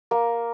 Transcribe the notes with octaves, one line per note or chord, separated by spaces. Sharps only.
A#3